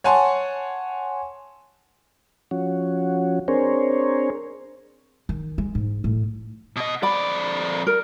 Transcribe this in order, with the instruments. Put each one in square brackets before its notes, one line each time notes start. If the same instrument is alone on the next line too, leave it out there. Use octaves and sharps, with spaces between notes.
[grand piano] C#5 F#5 G#5 A5 C6
[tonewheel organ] F3 C#4 F#4
C4 D4 G#4 A#4 C5 C#5
[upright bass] D#3
G#3
G#2
A2
[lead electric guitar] B2 D#5
[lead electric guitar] F2 D5 [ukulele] B5
[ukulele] A#4